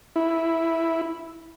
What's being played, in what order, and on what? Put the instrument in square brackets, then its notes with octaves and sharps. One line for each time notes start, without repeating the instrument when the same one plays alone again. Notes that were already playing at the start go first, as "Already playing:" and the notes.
[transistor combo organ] E4